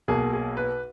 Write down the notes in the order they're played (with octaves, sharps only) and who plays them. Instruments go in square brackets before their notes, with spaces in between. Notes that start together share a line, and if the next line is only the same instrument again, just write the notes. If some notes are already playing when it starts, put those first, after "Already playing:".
[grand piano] B1 B2 A#3 G#4
G#4
B4